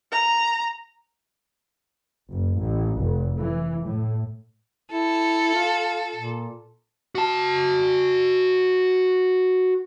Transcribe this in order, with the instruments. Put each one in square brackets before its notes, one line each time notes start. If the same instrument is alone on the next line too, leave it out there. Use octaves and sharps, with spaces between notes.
[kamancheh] A#5
[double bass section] F#1
A1
F1
E3
A2
[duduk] E4 [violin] A4
[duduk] F4
A#2
[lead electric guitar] F#4 A5